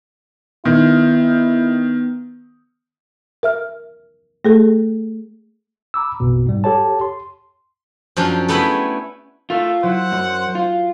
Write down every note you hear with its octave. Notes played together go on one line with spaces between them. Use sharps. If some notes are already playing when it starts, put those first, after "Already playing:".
D#3 B3 E4
A#4 E5 F6
A3 G#4 A4
A#5 B5 D6 E6
A#1 F2 B2
G#2 G3
G4 A4 C#5 A5
C6
F#2 F3 C#4 D4 C6
A3 B3 E4 G5 G#5 B5
A3 F4 A#4
F#3 E4 C5 F#5 E6
F#2
F4